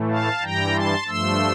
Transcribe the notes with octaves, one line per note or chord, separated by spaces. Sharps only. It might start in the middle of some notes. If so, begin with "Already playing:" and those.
Already playing: A2 E3 A3
F5 A5
G2 E3 G3 G5 A#5
A5 C6
G2 F3 A3 C6 E6